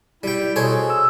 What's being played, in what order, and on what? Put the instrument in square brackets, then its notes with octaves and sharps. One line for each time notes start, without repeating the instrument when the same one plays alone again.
[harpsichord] G3 G5 [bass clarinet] E4
[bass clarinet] B2 [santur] G#4 [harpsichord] A4 C5 C#5
[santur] E6